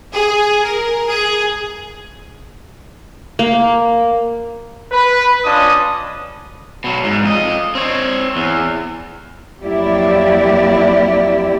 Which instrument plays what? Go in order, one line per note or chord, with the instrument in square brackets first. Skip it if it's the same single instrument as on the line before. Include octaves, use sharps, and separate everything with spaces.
[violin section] G#4
A#4
G#4
[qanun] A#3
[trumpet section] B4
C#4 D4 F4 D#5 D#6
[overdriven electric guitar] B2 F#3
G#2
F2 D#5
C4 C#5
E2
[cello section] F2 F#3 A#3 E4 G4 D5